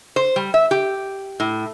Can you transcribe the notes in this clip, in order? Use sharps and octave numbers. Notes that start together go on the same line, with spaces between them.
C5
G3
E5
G4
A2